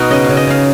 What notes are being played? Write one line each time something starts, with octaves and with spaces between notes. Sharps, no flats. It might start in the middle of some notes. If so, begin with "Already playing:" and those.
Already playing: B2 D#4 F#4
C#3 D#5
C#3 F5
D#5
C#3 F5